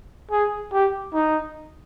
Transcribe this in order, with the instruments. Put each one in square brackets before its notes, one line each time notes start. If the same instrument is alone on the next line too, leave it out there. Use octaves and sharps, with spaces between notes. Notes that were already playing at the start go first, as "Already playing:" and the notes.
[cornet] G#4
G4
D#4